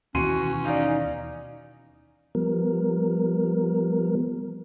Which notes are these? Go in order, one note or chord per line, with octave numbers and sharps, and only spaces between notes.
D#2 B2 E3 C#4 F#4 C6 D#7
D#4 D5 F5
F3 G3 B3 A#4